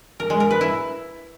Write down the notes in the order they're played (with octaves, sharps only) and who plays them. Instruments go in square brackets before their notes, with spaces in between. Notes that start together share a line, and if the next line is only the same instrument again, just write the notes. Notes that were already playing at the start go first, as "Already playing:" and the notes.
[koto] A#4
G#3
A#4
B4
E4